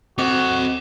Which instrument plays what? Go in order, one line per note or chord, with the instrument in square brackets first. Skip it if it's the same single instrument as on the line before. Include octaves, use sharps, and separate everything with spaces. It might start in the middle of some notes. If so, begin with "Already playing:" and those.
[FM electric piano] C4 [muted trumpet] F#4 [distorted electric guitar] A4 D#5 [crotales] D6